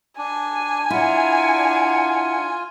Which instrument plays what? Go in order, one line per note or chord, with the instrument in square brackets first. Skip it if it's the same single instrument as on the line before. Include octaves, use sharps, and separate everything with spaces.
[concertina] D4 [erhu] G#5
[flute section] D4 F#5 A#5 [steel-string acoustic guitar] E4 [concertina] F4